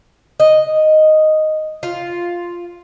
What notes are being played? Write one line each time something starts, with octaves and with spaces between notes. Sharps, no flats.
D#5
F4